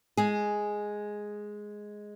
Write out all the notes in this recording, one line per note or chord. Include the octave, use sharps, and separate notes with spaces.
G#3 G#4